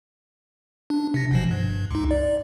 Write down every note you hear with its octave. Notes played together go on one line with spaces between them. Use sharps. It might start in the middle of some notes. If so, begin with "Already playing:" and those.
D4
C3 A#6
G1 B2 F3
G2
C#2 D#4
D5